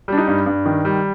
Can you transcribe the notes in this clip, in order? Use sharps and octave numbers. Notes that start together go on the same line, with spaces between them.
G3 D4
D#4
G2
G2
D#3
G3